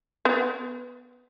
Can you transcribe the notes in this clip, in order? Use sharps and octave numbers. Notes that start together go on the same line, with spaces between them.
B3